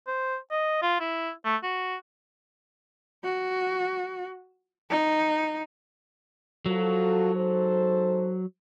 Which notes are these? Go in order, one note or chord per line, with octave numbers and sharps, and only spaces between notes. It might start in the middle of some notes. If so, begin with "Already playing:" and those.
C5
D#5
F4
E4
A3
F#4
F#4
D#4
F3 F#3 F#4 A4
G#2 A4 C5